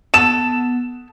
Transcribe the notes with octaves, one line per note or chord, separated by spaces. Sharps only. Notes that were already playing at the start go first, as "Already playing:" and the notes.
B3 A4 E7